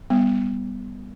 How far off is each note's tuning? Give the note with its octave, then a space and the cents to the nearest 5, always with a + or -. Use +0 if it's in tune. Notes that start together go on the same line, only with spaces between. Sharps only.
G3 +15 B3 +0